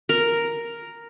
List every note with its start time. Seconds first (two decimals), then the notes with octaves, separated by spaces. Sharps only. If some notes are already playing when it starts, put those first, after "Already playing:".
0.09 A#4